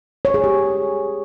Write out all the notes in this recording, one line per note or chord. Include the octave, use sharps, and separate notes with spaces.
C#5
G#4
G4